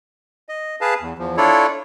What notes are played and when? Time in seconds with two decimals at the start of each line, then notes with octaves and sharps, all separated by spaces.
0.49 D#5
0.81 G#4 B4 F5 A5
1.01 E2
1.18 E2 F3
1.37 D4 E4 F4 A4 C#5 D5